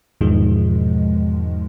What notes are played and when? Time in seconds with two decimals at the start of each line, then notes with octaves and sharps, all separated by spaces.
0.21 E2 G#2 B2 D#3 F3 G#3